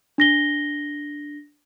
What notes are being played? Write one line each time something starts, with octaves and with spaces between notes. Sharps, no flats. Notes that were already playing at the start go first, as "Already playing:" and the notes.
D4 A#6 G7